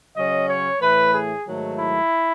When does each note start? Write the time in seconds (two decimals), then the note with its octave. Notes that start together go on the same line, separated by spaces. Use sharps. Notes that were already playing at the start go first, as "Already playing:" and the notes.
0.16 C#3 F#3 C#4 D#5
0.48 C#5
0.81 A2 E3 A3 B4
1.14 G#4
1.46 G#2 D#3 F#3 A3
1.79 E4